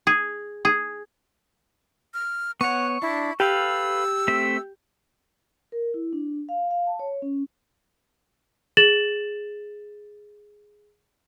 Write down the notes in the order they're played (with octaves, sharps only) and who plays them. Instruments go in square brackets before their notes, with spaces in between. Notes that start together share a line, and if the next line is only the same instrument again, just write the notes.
[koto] G#4
G#4
[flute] F6
[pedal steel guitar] B3 C#5 [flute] F#5 [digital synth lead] C#6
[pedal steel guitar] D4 [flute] E4
[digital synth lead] G4 [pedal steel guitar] A4 B4 F5 [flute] E6
[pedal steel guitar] A3 C4 E5
[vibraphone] A#4
E4
D4
F5
F5
A5
C#5
C#4
[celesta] G#4 A6 E7 F#7